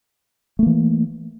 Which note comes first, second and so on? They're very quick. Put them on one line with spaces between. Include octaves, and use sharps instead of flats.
A3 A#3 E3